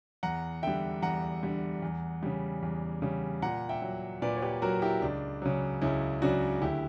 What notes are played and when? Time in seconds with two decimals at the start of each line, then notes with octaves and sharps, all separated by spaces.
0.23 E2 F#5 A#5
0.63 D3 G3 E5 G5
1.02 E2 F#5 A#5
1.43 D3 G3
1.82 E2
2.23 C#3 G3
2.63 E2
3.02 C#3 G3
3.42 A#2 F#5 A#5
3.69 E5 G5
3.82 F#3
4.22 A#2 B4 D5
4.36 C#5
4.42 G4 B4
4.62 F#3 F#4 A#4
4.82 E4 G4
5.02 C#2 D4
5.42 C#3 F#3
5.82 C#2 C#4 E4
6.22 C#3 F#3 D4 F#4
6.62 D2 E4 G4